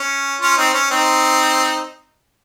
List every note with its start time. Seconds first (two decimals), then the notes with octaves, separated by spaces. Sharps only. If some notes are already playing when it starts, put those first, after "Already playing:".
Already playing: C#4
0.42 C#4 F4
0.57 C4 D#4
0.74 C#4
0.91 C4 D#4